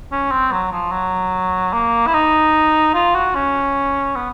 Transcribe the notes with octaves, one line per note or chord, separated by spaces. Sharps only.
C#4
C4
F#3
F3
F#3
A#3
E4
D#4
F4
F#4
C#4
B3